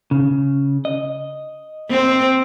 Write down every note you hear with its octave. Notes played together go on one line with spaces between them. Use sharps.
C#3
D#5
C4